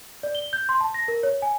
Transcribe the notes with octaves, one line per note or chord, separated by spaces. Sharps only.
D5
G7
G6
C6
A5
A#6
A#4
C#5
G#5